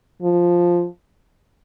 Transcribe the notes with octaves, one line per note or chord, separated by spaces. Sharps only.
F3